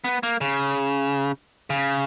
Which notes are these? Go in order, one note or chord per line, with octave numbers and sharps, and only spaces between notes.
B3
A#3
C#3
C#3